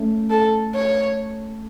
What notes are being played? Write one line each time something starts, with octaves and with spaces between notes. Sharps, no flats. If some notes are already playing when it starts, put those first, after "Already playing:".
Already playing: A3 C#4
A4
C#5